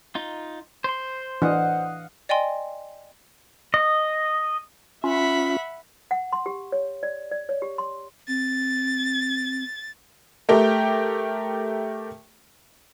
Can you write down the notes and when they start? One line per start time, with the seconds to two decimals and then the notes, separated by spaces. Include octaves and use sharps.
0.15 D#4 F4
0.84 C5 C6
1.42 E3 D4 D#5 F5 F#5
2.29 D5 D#5 G5 G#5 C6
3.74 D#5
5.04 C#4 F4 E5 F#5 B5
6.11 F#5
6.33 C6
6.46 G4
6.72 C#5
7.03 D5
7.32 D5
7.49 C#5
7.62 G4
7.78 C6
8.28 C4 A6
10.49 A3 G4 A#4 G5